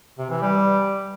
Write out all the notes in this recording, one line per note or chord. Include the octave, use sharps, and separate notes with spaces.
C3
E3
G3